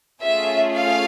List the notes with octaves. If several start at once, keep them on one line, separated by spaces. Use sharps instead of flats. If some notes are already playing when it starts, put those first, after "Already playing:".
A3 C#4 F4 G#4 E5
F5